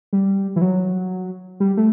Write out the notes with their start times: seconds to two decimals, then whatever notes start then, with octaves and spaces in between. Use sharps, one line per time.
0.13 G3
0.56 E3
0.62 F#3
1.60 G3
1.77 A3